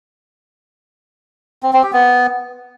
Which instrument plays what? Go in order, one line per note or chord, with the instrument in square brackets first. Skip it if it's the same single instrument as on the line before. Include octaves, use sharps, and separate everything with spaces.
[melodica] C4
C4
G4
B3